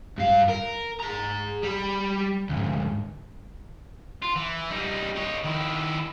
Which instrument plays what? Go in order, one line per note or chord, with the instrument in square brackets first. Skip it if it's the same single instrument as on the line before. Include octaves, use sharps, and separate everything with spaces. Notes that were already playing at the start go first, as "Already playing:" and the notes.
[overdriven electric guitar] G2 F5
A#4
G#4 A#5
G3 B5
D2 G#2
[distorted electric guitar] F4
E3
G3 D#4
D#4 C#5
D#3 E4